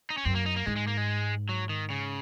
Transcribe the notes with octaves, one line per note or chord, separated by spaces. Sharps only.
D#4
C#4
F#2 C4
A#3
D#4
A#3
G#2 G#3
G#3
A#3
G#3
F#3
D#3
C#3